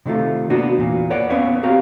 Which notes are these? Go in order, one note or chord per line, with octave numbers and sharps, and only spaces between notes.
C3 D#3 A3 F4
A#3 B3 D4 F#4
E2 A#2
B4 C#5 D5 F#5
B3 C#4 B4 C#5 E5 F5
C4 F#4 G4 A#4 F5